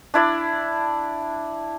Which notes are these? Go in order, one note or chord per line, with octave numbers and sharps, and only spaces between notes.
D4 E4 D5